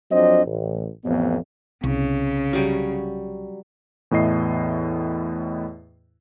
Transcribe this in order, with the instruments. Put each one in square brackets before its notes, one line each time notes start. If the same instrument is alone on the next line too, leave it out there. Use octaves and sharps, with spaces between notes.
[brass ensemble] F2 F#3 C4 D4 C5 D#5
A1
A1 F2 B3
[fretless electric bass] C2 [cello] C#3
[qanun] F#3 G3
[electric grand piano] E2 A2 E4 D#5 C7